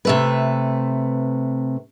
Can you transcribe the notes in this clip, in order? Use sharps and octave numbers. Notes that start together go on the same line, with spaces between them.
C3 A3 B4